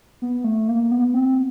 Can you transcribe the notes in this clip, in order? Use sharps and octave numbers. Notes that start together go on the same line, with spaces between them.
B3
A3
A#3
B3
C4